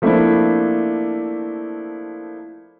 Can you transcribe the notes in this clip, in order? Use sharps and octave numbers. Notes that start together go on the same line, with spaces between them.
F3 A3 A#3 C4 D4 E4